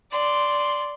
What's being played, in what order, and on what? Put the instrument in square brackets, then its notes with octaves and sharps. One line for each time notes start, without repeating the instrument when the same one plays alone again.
[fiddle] D5 C6